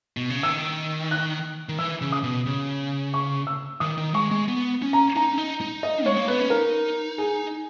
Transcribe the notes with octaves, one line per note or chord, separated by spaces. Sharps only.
B2
C#3
D#3 E6
F#6
D#3
E3 E6
C#3
D#6
B2
C#3
C#6
E6
D#3 D#6
D#3
G#3 C#6
G#3
B3
C#4
A#5
D#4 A#5
C#4
D#4
D#4
D#5
G#3 C#5
A#3
B3 B4
C#4
D#4 A#4
G#4